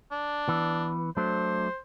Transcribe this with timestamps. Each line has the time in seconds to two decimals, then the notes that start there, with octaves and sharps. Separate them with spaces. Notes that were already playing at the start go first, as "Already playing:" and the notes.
0.11 D4
0.49 E3 B3
1.17 F#3 A3 D4 C5